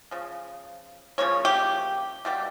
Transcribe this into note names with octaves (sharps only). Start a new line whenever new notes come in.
C#3 F3
C#3 F3 A#3 C#5
G4
B2 G3 A#3 G4